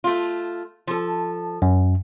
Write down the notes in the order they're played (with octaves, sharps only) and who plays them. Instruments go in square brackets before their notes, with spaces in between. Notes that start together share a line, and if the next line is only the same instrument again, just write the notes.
[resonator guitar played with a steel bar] A3 F4
F3 A4
[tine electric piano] F#2